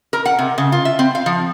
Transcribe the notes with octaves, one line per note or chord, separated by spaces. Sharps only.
A#4
F#5
C3
C#3
F4
E5
C4
F5
F3